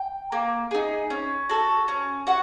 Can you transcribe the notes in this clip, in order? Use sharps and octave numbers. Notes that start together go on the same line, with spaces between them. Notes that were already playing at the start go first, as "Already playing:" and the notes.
Already playing: G5
A#3
D#4 G#4
C#4
F#4 A4
C#4
F#4 F#5